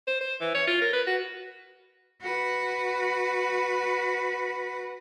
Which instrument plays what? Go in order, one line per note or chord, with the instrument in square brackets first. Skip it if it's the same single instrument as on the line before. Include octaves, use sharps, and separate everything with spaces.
[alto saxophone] C5
C5
E3
C#5
F4
A#4
B4
F#4
[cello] F#4 B4